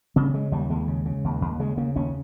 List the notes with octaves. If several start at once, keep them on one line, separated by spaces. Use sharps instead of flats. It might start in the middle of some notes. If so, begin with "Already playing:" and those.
C#3 C4
C#3 G#3
D#2 G3
D#2 G#3
C#3
C#3
D#2
D#2
C#3 G#3
C#3 A#3
D#2 C#4